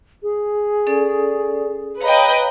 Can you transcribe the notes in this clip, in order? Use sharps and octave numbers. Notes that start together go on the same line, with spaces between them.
G#4
C#4 A4 D5
B4 C#5 D#5 F5 G5 A#5